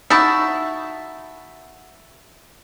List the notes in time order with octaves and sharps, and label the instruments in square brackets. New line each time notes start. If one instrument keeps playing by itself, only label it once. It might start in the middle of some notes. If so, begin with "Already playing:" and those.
[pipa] D#4 E4 F#4 [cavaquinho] E5 A5